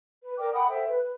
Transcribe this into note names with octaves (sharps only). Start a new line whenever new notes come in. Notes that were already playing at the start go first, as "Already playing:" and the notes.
B4
A#4 D5 G5 D6
F#5 G5 B5 D#6
A4 C5 E5 G5
B4
B4